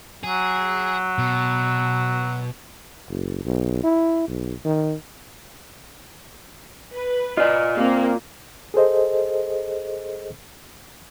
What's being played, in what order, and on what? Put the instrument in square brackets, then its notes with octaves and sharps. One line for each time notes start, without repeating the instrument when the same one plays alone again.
[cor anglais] F#3 [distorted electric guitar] G#4
[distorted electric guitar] B2
[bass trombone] F#1
B1
E4
B1
D#3
[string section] B4
[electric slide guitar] F4 D5 [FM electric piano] D#5
[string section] A#3 [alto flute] C4
[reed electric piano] G#4 A4 C5 D#5